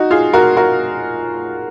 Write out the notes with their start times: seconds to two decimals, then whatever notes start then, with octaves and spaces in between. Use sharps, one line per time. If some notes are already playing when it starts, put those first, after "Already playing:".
Already playing: D#4 F#4
0.11 F4 G#4
0.33 F#4 A#4
0.57 F#4 A#4